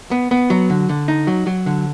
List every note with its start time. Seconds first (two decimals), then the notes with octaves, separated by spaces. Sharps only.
0.11 B3
0.31 B3
0.50 F#3
0.70 D3
0.89 D3
1.08 D#4
1.27 F#3
1.47 F#3
1.66 D3